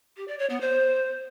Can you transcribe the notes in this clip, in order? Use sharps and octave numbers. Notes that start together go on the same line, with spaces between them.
G4
D5
C#5
B3
C5